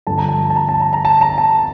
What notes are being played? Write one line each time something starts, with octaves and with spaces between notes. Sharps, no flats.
G2 D3 F3 A5
A#5
A5
A5
A#5
A5
A#5
A#5
A5
A#5
A5